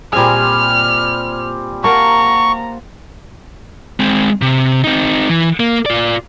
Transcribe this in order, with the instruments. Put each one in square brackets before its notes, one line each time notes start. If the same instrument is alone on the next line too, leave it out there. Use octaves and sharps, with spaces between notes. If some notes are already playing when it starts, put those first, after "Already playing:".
[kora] A#2 G#4 [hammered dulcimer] G3 C4 G#5 [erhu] F6
[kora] A#3 A#4 [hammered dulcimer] F#5 A5 [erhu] A#5 [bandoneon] C#6
[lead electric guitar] G#3 C4
C3
C4 D#4
E3
A#3
F4 D5